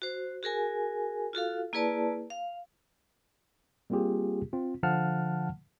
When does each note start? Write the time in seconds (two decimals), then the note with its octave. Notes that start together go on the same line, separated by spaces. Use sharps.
0.02 F#4 C5
0.43 F#4 G#4 A#4 G#5
1.33 F4 F#4 A4 F5
1.73 A#3 E4 G#4 B4 D5 A5
2.30 F5
3.90 G3 A#3 C4 F4 G4 G#4
4.53 C4 F4
4.83 D3 F3 F5 F#5 A5 F6